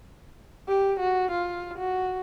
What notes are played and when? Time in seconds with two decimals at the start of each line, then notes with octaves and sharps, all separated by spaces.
0.68 G4
0.99 F#4
1.31 F4
1.78 F#4